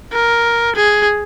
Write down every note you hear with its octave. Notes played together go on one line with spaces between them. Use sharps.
A#4
G#4